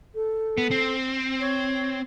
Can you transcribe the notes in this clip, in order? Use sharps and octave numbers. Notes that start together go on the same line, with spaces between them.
A4
B3
C4
C#5